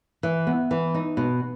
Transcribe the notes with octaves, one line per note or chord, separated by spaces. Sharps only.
E3
B3
E3
D#4
B2